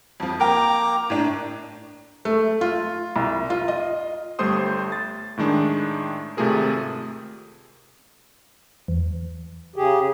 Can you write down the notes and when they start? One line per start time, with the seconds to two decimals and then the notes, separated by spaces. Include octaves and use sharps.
0.20 F2 F3
0.40 A#3 A#4 G5 A#5 D6
1.10 A2 D4
2.25 A3
2.61 F4
3.16 C2
3.50 F4
3.68 D#5
4.39 G1 G3 A3 C5 C6 D#6
4.92 A6
5.37 A2 D#3 G#3 D4
6.37 G#1 C3 A3 F4 G#4 A#4
8.88 E2
9.76 C#3 G4 G#4